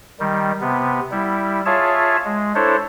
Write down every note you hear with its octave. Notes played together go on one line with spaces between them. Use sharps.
D#3 G3
C3 B3
G3 E4
F4 G#4 C#5 E5 A5
G#3
D4 E4 A4 C5 C#5